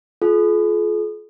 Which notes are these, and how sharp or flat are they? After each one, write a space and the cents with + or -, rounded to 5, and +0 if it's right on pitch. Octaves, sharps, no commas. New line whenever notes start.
F4 +0 G#4 +45